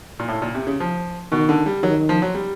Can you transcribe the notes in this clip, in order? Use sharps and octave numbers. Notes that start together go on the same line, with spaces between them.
A#2
A2
A#2
C3
C#3
F3
B2 D#3
D3
G3
D#3 F#3
F3
F#3
G3